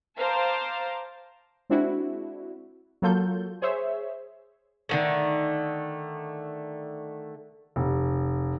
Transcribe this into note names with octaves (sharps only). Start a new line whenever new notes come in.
C5 F5 A5 A#5 D6
G#3 C4 D4 E4 F#4
F#3 A#3 F4 A4 G6
G#4 C5 C#5 E5
D3 D#3 A3
F1